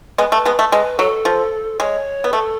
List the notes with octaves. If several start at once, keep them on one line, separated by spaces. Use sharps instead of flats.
G#3 B3 B4
A3
B4
G#3 B3
A3
G#3 B4
F#3 A4
F3
G#3 C#5
B3
A3 A4